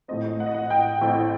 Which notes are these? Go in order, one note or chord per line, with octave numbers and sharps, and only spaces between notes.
A1 A2 A3 C4 D#5
F#5
D#5
F#5
G5
A1 A2 A3 C4